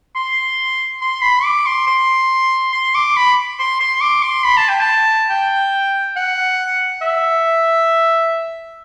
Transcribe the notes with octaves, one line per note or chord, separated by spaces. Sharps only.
C6
C6
B5
D6
C6
C6
C6
D6
B5
C6
C6
D6
C6
B5
A5
G5
A5
G5
F#5
E5